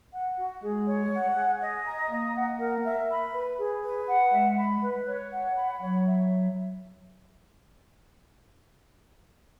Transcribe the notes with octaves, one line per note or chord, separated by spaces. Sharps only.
F#5
F#4
G#3 G#4
C#5
F#5
G#4
D#5
A#5
A#3 D#5
F#5
A#4
E5
B5
B4
G#4
B4
F#5
G#3 E5
B5
B4
C#5
F#5
B5
F#3 C#5
E5